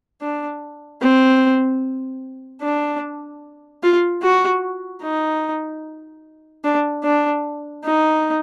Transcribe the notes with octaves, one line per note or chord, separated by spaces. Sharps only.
D4
C4
D4
F4
F#4
D#4
D4
D4
D#4